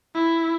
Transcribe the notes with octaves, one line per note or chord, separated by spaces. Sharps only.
E4